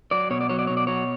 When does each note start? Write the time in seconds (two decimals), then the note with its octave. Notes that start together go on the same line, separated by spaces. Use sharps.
0.11 F#3 D5
0.30 B2 C#5
0.41 D5
0.49 F#3 C#5
0.59 D5
0.67 B2 C#5
0.77 D5
0.87 F#3 C#5